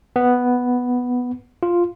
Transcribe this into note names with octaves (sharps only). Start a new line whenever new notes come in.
B3
F4